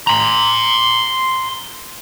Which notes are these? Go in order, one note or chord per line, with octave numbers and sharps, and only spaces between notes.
A#5 C6